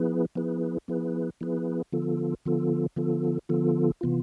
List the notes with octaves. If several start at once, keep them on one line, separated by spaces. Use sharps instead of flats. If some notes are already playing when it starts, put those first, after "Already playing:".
Already playing: F3 B3 E4 G#4 B4
F3 B3 E4 G#4 B4
F3 B3 E4 G#4 B4
F3 B3 E4 G#4 B4
D3 F3 B3 F4 A4
D3 F3 B3 F4 A4
D3 F3 B3 F4 A4
D3 F3 B3 F4 A4
C3 E3 B3 F4